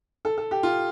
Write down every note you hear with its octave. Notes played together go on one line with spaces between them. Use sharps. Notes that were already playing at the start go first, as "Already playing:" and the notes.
A4
A4
G4
F4